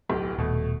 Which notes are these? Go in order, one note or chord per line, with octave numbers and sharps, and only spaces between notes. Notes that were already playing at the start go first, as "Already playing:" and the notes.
D1 B1 G4
D#1 B2 A3